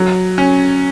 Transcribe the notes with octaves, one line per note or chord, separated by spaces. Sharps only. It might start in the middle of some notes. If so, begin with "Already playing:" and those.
Already playing: F#3
C#4